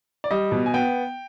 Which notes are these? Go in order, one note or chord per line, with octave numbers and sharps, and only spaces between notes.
D5
G3 D#5
B2
G#5
B3 G5